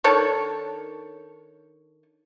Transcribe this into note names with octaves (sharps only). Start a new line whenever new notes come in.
D#3 D4 A4 C#5